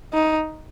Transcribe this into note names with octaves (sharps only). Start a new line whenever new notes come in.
D#4